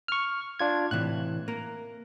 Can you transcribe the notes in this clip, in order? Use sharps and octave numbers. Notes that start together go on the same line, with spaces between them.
C#6 F6
D4 F4 G#6
A2 C3 E3 F#6
A#3 A#4